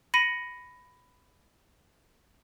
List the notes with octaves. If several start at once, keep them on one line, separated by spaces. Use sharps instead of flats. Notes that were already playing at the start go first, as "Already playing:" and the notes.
B5 A#6 C#7 D#7